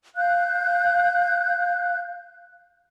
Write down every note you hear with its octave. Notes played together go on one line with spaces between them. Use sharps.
F5 F#6 G6